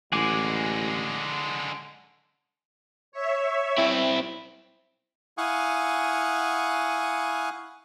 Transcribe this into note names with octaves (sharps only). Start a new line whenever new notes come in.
A1 D3 G#3 F#5 G#5 D6
C#5 E5
C4 E4
E4 F5 F#5 G#5 C#6 D#6